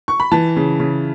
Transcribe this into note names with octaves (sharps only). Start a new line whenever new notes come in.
C#6
B5
E3 A5
C#3
C#3